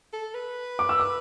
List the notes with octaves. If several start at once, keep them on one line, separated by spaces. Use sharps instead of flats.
A4
B4
D6
E6
D6